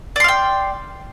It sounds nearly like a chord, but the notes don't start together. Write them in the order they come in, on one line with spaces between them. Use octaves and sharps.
D5 C6 F5 G5